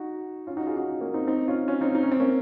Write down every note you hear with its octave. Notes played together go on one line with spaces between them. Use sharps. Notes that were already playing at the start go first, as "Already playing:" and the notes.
Already playing: D#4 F#4
C#4 F4
D#4 F#4
F4 G#4
D#4 F#4
A#3 C#4
C4 D#4
C4 D#4
C#4 F4
C#4 F4
C4 D#4
D#4
C#4
C4
A#3 C#4